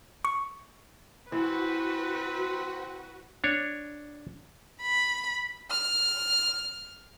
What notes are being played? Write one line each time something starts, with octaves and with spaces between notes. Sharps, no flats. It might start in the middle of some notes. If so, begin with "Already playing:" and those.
C#6
E3 C4 F#4 B4
D4 C#5
B5
F6